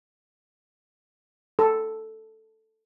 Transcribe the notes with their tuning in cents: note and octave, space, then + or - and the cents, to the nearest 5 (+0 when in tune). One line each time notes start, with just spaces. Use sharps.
A4 +0